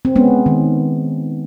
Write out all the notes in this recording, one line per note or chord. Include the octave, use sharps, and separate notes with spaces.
C4
G#3 B3 C#4
D#3